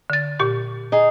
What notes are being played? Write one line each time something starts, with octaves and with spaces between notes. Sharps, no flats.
D3 A6
A#2 G4 C#6
D#4 G#4